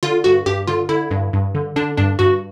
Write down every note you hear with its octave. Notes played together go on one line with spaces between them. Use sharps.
D3 F4
G2 F#4
G2 G4
D3 F4
D3 E4
G2
G2
D3
D3 D4
G2 D4
G2 F#4